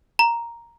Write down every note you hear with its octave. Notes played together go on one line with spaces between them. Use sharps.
A#5